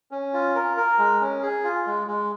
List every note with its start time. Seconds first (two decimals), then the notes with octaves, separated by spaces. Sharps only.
0.11 C#4
0.33 F4
0.55 A#4
0.77 A#4
0.98 G#3
1.21 C#4
1.42 G#4
1.64 F4
1.87 G#3
2.07 G#3